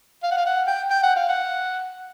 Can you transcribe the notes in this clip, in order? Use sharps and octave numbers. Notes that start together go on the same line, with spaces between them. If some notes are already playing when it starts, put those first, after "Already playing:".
F5
F#5
F5
F#5
G5
G5
F#5
F5
F#5